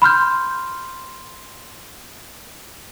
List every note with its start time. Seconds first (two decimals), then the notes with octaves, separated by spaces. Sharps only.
0.02 B5 C6 F6 G6